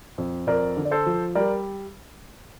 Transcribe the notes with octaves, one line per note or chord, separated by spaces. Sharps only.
F2
F2 A#4 D5
D3
D5
A4 C5
F3
G3 A#4 D5